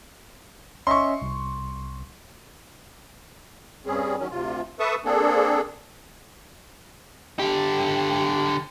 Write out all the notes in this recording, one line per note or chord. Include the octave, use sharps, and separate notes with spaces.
C#4 D#5 E5 C6 C#6
C2
G2 G3 C4 C#4 G#4
D#3 F#3 C#4
D2 C3 F4
A4 B4 E5 A5 C#6 D#6
A#3 C4 D4 G#4 A4
D3 G4